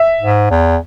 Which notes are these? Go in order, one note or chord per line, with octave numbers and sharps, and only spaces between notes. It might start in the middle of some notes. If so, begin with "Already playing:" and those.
Already playing: E5
G#2
E2